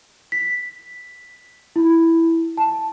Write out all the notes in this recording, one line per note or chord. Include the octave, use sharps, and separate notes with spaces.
B6
E4
A5